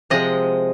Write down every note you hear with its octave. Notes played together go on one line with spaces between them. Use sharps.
C3 F3 G#3 D#5